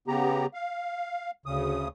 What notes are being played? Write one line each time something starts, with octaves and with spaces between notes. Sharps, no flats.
C#3 B3 G4 A#5
F5
D2 C#3 D#6